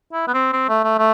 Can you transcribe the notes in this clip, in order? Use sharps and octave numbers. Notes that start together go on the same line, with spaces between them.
E4
B3
C4
C4
A3
A3
A3